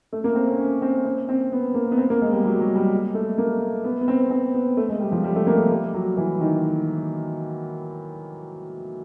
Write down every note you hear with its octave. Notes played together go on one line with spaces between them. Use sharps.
A3
A#3
C4
C#4
C#4
C4
C4
C4
B3
A#3
B3
C4
A#3
G#3
G3
F#3
F#3
G3
G#3
A3
A#3
B3
B3
C4
C4
B3
A3
G#3
G3
F3
G3
A3
A#3
A3
G3
F#3
E3
D#3